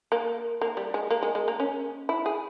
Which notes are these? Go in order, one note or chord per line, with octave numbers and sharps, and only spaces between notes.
A#3
A#3
G3
G#3
A#3
G#3
G#3
A#3
C#4
E4
G#4